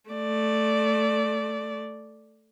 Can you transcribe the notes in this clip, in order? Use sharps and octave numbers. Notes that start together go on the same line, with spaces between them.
A3 D5